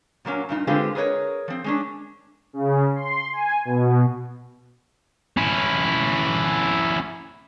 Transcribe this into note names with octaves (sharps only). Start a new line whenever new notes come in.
A#2 F#3 A#3 C#4
G2 A#2 D#4
D3 G#3 C4 F4 G4 B4
G#4 A#4 B4 C#5 D#5
F3 C4
G#3 C#4 D4
C#3
C6
G#5
B2
C#4 E4